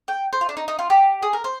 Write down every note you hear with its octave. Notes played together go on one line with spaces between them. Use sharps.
G5
C5
F4
D4
D#4
D#4
F4
G4
G#4
A#4
C5